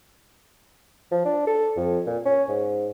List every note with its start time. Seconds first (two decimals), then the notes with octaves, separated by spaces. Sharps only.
1.11 F3
1.25 D4
1.47 A4
1.77 F2
2.07 A#2
2.25 C#4
2.48 G#2